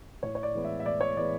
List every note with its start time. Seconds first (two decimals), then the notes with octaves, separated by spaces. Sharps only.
0.23 A2 C#5
0.35 C#5
0.43 D5
0.55 E3 G#3 B3
0.65 E5
0.80 E5
0.86 A2 D5
1.01 C#5
1.16 E3 G#3 B3 D5